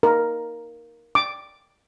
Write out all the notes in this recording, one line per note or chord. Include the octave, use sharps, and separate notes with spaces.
A#4
D6